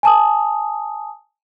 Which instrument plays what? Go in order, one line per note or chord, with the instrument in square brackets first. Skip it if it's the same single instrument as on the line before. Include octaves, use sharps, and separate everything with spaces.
[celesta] G#5 A5 D#6